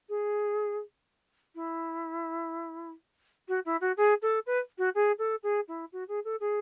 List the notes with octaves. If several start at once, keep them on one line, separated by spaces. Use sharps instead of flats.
G#4
E4
F#4
E4
F#4
G#4
A4
B4
F#4
G#4
A4
G#4
E4
F#4
G#4
A4
G#4